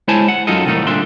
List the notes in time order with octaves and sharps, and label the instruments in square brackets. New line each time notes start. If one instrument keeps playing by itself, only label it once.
[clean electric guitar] G#3 E4 C5 C#5 G#5 A5
F#5
F#2 F#3 D#4 F4 A4 D#5
C2 A2 D#3 A3 D#4
C2 A#2 D3 D4 E5 C6